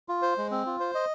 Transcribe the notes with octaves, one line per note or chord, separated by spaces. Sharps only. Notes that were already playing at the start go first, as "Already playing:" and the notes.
F4
C5
G#3
C4
F4
C5
D#5